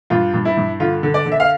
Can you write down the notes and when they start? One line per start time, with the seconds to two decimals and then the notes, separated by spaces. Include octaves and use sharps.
0.10 G2 F4
0.34 G2
0.45 E4
0.57 G2
0.80 D3 F4
1.03 D3
1.14 D5
1.26 D3
1.32 E5
1.40 F5